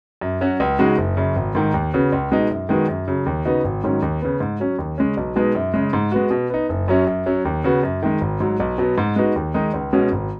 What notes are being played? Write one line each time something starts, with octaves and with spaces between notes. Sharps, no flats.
F#2
F#3 C#4 F#4
C#2
C#3 G#3 D#4 F#4
F#1
F#2 C#3
G#1
G#2 D#3
D#2
C#3 B3 F#4
C#2
B2 G#3 D#4
F#2
D#3 G#3 B3 F#4
F#2
C#3 F#3
D#2
C#3 B3 D#4 F#4
G#1
G#2 D#3 F#3 C#4
D#2
C#3 B3
G#2
F#3 C#4
D#2
C#3 G#3 C#4
B1
B2 G#3 B3 D#4
F#2
C#3 G#3
G#2
G#3 B3 F#4
B2
B3 D#4
F#1
F#2 F#3 C#4
F#2
F#3 C#4
D#2
C#3 B3 F#4
F#2
D#3 G#3
G#1
G#2 F#3
B1
B2 F#3 B3
G#2
G#3 B3 D#4 F#4
D#2
D#3 G#3 D#4
C#2
B2 G#3 C#4 F#4
G#1